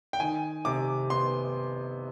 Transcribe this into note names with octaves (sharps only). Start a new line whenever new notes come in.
G5
D#3 G#5
C3 D6
B3 C6